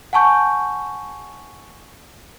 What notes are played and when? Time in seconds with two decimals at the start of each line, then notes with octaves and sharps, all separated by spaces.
0.13 F#5 G#5 A5 C#6 G6